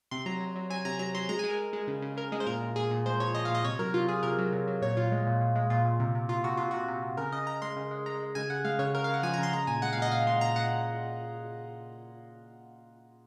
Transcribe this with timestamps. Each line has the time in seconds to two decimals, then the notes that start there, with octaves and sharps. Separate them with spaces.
0.11 C3 C6
0.26 F#3 A#5
0.40 F#3
0.56 F#3
0.70 F#3 G#5
0.85 C3 A#5
0.99 F#3 A#5
1.14 F#3 C6
1.29 G#3 A#5
1.39 G#5
1.44 G#3
1.49 A#4
1.59 G#3
1.73 G#3
1.87 C#3
2.02 C#3
2.17 C#3 A#4
2.32 G#3 G#4
2.40 C5
2.47 A#2 A#4
2.62 A#2
2.76 A#2 G#4
2.91 A#2
3.06 G#3 C5
3.20 F3 C#5
3.35 F3 D#5
3.45 F5
3.50 A#2 D#5
3.64 C3 C#5
3.79 F#3 A#4
3.94 C3 F4
4.08 F#3 G#4
4.23 C3 A#4
4.38 F#3
4.52 C3
4.67 F#3
4.82 A#2 C#5
4.97 A#2 F4
5.12 G#3
5.27 A#2
5.41 A#2
5.56 G#3
5.70 A#2 F4
5.85 A#2
6.00 C3
6.15 C3
6.29 C3 F4
6.44 C3 F#4
6.57 C3 F4
6.71 C3 F#4
6.88 C3
7.03 C3
7.17 C#3 A#4
7.32 C#3 D#5
7.47 C#3 A#5
7.62 G#3 C6
7.76 C#3
7.91 G#3
8.06 G#3 A#5
8.20 G#3
8.35 C#3 G#5
8.50 C#3 F#5
8.65 G#3 F5
8.79 C#3 C#5
8.94 C#3 A#4
9.04 F5
9.09 C#3 F#5
9.23 F3 G#5
9.34 A#5
9.38 C#3 C6
9.53 G#3 A#5
9.67 A#2 G#5
9.82 G#3 F#5
9.93 F5
9.97 A#2 D#5
10.12 A#2 F5
10.27 G#3 C6
10.41 A#2 A#5
10.56 A#2 F#5